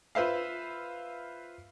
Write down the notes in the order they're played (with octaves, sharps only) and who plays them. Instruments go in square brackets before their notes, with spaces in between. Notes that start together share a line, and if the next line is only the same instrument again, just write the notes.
[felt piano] F4 B4 C5 E5 F5